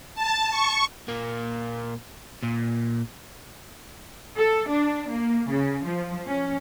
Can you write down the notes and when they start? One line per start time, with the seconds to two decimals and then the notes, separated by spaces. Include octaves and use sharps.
0.15 A5
0.50 C#6
1.08 A#2 A#3
2.43 A#2
4.36 A4
4.69 D4
5.10 A#3
5.50 C#3
5.85 F3
6.26 C#4